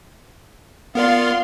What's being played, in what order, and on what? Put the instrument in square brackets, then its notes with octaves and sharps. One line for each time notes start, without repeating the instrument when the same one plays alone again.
[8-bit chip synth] B3 A#4 D5 [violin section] F4 F5 C6